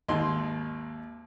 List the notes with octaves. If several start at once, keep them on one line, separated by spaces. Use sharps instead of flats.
G#1 D#2 D#4 C6